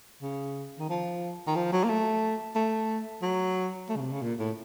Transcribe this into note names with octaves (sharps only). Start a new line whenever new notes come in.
C#3
D#3
F3
D#3
F3
F#3
A#3
A3
A3
F#3
A3
C#3
C3
C#3
A#2
A2